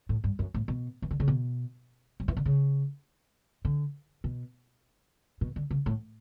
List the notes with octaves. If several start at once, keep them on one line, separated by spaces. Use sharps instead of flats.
A2
G2
F#2
A2
B2
E3
D3
C#3
B2
F#3
E3
D3
C#3
D3
B2
B2
D3
C#3
A2